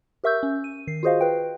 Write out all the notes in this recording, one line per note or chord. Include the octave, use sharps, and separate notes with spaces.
G4 A#4 E5 C#6 E6 G6
C#4
D#7
D#3 C7
F4 F#4 G#4 C5 D#5 F5
B4 G5